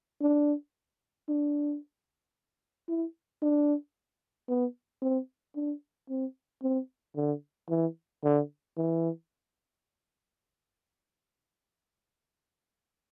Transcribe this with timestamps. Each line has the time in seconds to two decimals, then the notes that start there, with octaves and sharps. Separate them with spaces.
0.21 D4
1.28 D4
2.88 E4
3.42 D4
4.49 B3
5.02 C4
5.56 D4
6.09 C4
6.63 C4
7.16 D3
7.69 E3
8.24 D3
8.77 E3